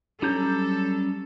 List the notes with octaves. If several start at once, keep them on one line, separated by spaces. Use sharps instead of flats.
F#3 G3 C#4 A4 A#5 G6